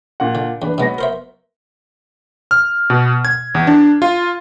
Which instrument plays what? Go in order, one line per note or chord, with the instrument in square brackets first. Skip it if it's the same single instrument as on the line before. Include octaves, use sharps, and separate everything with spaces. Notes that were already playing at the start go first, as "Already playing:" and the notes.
[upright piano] A#2 F#5
[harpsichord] D3
[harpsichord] E2 [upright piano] D4 B4
[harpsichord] B2 G#3 [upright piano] F#3 B3 A#6
[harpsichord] A#4 C5 E5
[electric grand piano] F6
B2
G#6
E2
D4
F4